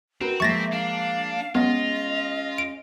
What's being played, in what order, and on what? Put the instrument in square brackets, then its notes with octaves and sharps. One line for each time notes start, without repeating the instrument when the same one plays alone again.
[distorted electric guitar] C4 [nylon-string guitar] F#4 A#4 B4
[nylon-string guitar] F3 G#3 A#3 [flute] E5 [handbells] C#6 A6 A#6
[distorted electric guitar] D4 [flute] F5
[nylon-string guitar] G#3 C#4 [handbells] B3 [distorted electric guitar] F4 [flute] D#5
[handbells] D7